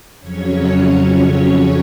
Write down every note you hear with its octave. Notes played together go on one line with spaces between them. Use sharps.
F2 C#3 F#3 C#4 C#5